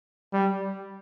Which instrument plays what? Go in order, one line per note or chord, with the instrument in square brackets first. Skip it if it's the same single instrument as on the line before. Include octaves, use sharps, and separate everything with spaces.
[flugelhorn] G3